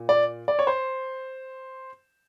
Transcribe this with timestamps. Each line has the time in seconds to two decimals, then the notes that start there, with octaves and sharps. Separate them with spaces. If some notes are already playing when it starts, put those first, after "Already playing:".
Already playing: A#2
0.09 D5
0.48 D5
0.59 C#5
0.67 C5